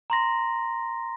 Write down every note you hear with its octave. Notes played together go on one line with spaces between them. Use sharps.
A#5 C6 A#6